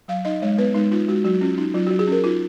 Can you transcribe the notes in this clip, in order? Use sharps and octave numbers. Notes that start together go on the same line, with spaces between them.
F#3 F5
D#4 D#5
G#3 C#5
B3 B4
G#3 D#4
D#4 F4
G#3 F#4
F#3 F#4
C#4 F4
C#4 D#4
F#3 F4
F#4
F#3
G#4
C#4 A#4
D#4 F4